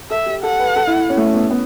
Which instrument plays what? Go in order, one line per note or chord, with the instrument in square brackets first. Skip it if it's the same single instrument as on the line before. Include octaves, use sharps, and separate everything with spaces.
[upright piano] A4 [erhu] E5
[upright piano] G4
[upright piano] A4 [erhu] F#5
[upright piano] B4
A4
E4
E4
C#4
A3
C#4
B3
C#4
B3